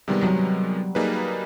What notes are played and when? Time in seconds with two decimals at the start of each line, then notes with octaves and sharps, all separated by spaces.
0.08 C3 D#3 G3 G#3 B3
0.22 F#3
0.95 G3 A#3 D#4 G#4 B4